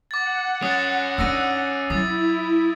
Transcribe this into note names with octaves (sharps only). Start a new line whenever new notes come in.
F#5 D6 A6
C#4 F#4 D#6 A6
D4 D#4 E6 A#6 D#7
F#3 E4 D#6 A6